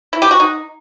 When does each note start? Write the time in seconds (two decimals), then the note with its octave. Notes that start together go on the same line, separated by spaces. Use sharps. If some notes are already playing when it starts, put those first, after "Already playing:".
0.13 E4
0.22 G4
0.31 F#4
0.40 D#4